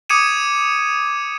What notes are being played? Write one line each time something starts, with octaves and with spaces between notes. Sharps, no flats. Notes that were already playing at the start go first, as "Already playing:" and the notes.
D6 D#6 G#6 C#7 D#7 E7